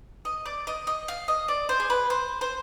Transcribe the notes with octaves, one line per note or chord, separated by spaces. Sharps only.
D#5
D5
D#5
D#5
F5
D#5
D5
C5
G#4
B4
C5
C5